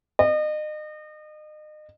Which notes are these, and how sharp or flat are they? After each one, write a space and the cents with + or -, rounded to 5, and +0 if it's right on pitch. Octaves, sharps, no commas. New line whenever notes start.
D#5 -35